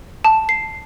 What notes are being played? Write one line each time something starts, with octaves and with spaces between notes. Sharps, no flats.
A5
C7